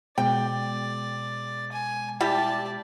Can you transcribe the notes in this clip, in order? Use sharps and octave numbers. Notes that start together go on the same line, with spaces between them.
B2 G#3 D5 G5
G#5
G3 E4 G4 D5 A5